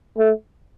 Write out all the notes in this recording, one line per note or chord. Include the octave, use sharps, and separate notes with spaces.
A3